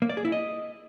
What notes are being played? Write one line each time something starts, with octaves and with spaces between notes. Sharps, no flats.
A#3
D5
G#4
E4
D#5